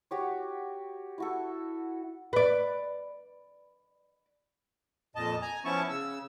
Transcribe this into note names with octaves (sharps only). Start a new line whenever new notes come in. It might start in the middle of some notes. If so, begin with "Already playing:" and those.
F#4 G4 C#5
E4 F#4 A4
B4 D5
F2 A#2 D#5 A5
G#5 A#5
F3 B3 C#4 E4 A5 C#6
C#3 E6